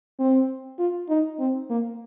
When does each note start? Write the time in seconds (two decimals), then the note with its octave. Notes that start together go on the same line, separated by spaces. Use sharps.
0.19 C4
0.79 F4
1.09 D#4
1.39 C4
1.70 A#3